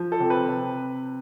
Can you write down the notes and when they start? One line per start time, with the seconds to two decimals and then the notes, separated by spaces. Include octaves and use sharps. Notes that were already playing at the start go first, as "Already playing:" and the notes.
Already playing: F3
0.12 A4
0.20 C3
0.30 B4
0.49 C3